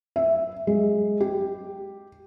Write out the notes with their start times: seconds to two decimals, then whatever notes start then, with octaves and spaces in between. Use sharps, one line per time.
0.16 E5
0.67 G#3
1.20 G4